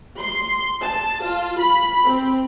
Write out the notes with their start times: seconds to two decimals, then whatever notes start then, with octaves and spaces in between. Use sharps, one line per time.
0.19 C6
0.83 A5
1.24 F4
1.60 B5
2.09 C4